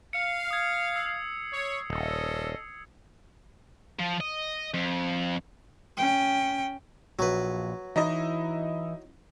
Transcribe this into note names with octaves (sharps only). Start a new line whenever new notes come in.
F5 C#7
D#6 G#6
E6 C7
C#5
D#1 C#4 A4 D#5
F3
D#5
F2
C#4 G5
A#1 F#3 B4
E3 D#4 E4 D#5